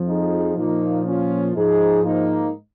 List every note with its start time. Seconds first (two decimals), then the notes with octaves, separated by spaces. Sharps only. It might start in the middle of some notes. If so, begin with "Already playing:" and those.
Already playing: F2 F3
0.08 D#4 G#4
0.57 A#2 F3 A#3 D#4
1.06 C#4 F4
1.56 G#2 F3 D#4 G#4
2.04 A#3 D#4